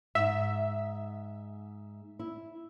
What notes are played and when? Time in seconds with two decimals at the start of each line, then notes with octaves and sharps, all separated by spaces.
0.15 G#2 E5
2.19 E4